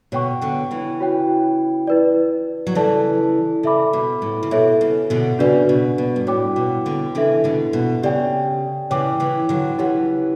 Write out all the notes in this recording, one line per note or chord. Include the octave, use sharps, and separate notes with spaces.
B2 D3 C#5 G5 C#6
B2 D3
C#3 E3
F#4 C#5 G5
E4 B4 D5
F#3
C#3 E3 A4 D5 A5
C#3 A4 E5 B5 D6
B2
A2
C#3
B2 A4 C#5 E5
C#3
B2 D3
C#3 D4 F#4 B4 D5
B2
B2
G2
A2 F#4 C#5 G5 D6
B2
B2 D3
C#3 E3 D4 A4 E5
B2 D3
B2
C#3 G4 D5 G5
C#3 E3 C#5 G5 D6
C#3 E3
D3 F#3
C#3 E3 E4 G4 C#5 F#5